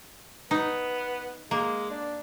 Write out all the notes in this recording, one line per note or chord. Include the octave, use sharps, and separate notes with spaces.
B3 D#4
G#3 A#3
D4